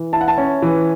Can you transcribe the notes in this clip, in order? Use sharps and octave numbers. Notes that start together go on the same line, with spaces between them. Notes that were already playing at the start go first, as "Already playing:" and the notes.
Already playing: E3
E4 A5
F#5
A5
C#4
E3